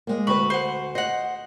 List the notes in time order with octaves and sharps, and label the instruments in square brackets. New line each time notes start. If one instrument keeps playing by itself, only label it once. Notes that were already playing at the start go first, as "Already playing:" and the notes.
[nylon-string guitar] G#3 A#3
[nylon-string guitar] D2 F#4 B4 [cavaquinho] B5 C#6
[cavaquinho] C5 F#5
[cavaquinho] C5 F#5 [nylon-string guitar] D#5